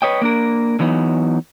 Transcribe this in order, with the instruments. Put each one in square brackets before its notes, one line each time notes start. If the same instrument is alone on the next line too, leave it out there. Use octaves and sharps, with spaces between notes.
[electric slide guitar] B4 C#5 D#5 G5
A#3 D4 A#4
D3 E3 F#3 B3 D#4